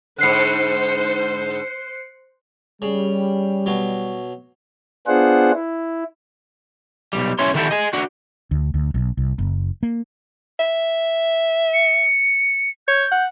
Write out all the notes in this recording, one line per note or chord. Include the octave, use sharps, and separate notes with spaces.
G#2 D3 C5 F#6 C7 C#7
C#3 G3
B2 F#3
B3 D4 F4 G#4 C5 F#5
E4
B1 E2 G3
B1 C#4 E4 C#5 C6
D3 D#3 G3 E4 G4 A4
G#4 D#5
D4 F#4
D2
D2
B1
C2
F#1
A#3
E5
C#7
C#5 G6
F#5